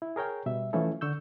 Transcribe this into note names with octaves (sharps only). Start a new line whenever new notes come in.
E4
G#4 A#4 C#5 G5
B2 G3 E5
E3 F3 A3 C#4 E4 A4
D3 C#6 E6 G6